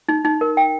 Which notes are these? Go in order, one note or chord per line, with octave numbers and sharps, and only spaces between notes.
D#4
D#4
A#4
G5